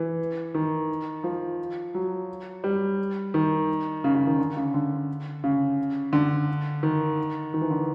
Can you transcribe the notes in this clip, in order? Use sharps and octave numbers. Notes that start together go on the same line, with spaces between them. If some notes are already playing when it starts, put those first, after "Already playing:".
Already playing: E3
D#3
F3
F#3
G3
D#3
C#3
C#3
D#3
D3
C#3
D3
C#3
D3
D#3
D#3
E3
D3